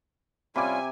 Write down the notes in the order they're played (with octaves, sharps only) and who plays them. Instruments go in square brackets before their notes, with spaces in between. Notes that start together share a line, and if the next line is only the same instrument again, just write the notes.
[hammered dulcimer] C3 [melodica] G3 C#4 F4 [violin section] G#5 [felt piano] B5 D6